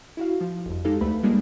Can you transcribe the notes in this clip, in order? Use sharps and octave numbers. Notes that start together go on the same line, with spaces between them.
E4 F#4 F5
F3
G1 F2
G#3 D#4 G4 A4 F5
D2 A3 B4 B5
G3 G#3 A#3 D4 F4